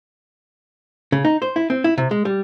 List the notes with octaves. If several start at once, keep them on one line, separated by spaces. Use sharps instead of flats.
C#3
D#4
C5
E4
C4
E4
C3
G#3
G3